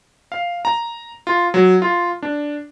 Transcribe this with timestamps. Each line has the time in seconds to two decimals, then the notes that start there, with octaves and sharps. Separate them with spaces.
0.32 F5
0.65 A#5
1.27 F4
1.54 F#3
1.82 F4
2.22 D4